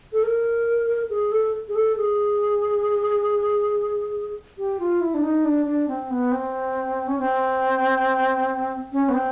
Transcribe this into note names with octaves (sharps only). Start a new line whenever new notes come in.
A4
A#4
G#4
A4
G#4
A4
G#4
G4
F4
E4
D4
D#4
D4
D4
C4
B3
C4
C#4
C4
C#4
B3
C4